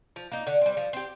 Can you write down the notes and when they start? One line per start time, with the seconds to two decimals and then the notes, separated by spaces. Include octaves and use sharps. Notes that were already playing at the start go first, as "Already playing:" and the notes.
0.16 F3
0.32 A#3 D#4
0.47 D3
0.62 G3 C4
0.77 F3
0.93 C4 G4